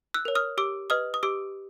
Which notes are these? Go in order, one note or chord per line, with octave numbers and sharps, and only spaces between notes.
E6 F#6
A#4 C#5
D#6 F6
G4 D6 E6
B4 D#5 D#6 F6
D#6
G4 D6 E6